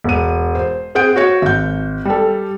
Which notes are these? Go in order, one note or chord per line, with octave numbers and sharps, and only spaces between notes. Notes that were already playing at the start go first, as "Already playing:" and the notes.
E1 D#7
C5
C4 G#4 F#5 G6 D7
F#4 C#5 C#7
G#1 G6
G3 A4